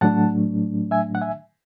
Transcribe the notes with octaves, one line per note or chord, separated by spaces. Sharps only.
A2 F#3 A3 D4 F#5 A5
E5 G#5
F#5
E5 G#5